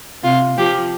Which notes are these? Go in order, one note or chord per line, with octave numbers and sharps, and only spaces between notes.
C3 F4
F3 G4